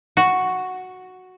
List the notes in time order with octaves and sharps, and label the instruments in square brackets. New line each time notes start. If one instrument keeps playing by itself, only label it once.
[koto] F#4